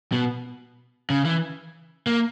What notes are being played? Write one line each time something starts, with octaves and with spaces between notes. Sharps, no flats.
B2
C#3
E3
A#3